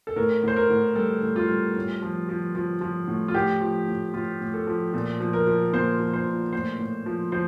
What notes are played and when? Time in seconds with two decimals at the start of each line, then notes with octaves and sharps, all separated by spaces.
0.07 A4
0.16 A2 A#4
0.43 A2 C5
0.56 A#4
0.70 A2
0.95 G3 A4
1.23 A2
1.36 F4
1.49 G3
1.76 A2
2.02 F3
2.29 F3
2.55 F3
2.81 F3
3.08 A2
3.28 F4
3.34 A2 G4
3.61 F3
3.88 A2
4.14 A2 F4
4.41 A2
4.54 A4
4.67 F3
4.94 A#2
5.20 F3
5.33 A#4
5.47 F3
5.73 A#2 C5
6.00 F3
6.13 C5
6.27 A#2
6.53 A2 C5
6.79 A2
7.06 F3
7.32 F3 C5